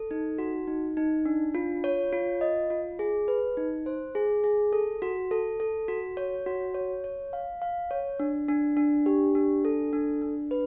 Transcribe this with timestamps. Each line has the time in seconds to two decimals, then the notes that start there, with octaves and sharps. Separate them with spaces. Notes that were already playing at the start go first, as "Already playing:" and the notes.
Already playing: A4
0.11 D#4
0.38 F#4
0.67 D#4
0.97 D#4
1.25 D4
1.55 F4
1.84 C#5
2.13 F4
2.41 D#5
2.70 F4
2.99 G#4
3.28 B4
3.57 D#4
3.86 C5
4.15 G#4
4.44 G#4
4.73 A4
5.02 F#4
5.31 A4
5.60 A4
5.88 F#4
6.17 C#5
6.46 F#4
6.74 C#5
7.04 C#5
7.33 F5
7.62 F5
7.91 C#5
8.20 D4
8.49 D4
8.77 D4
9.06 G4
9.35 D4
9.65 A4
9.93 D4
10.22 D4
10.51 B4